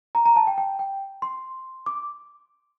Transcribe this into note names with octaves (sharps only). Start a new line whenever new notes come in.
A#5
A#5
A5
G5
G5
G5
C6
D6